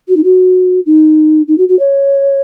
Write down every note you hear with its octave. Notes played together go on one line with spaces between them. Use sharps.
F#4
D#4
F#4
D#4
D#4
F#4
F#4
C#5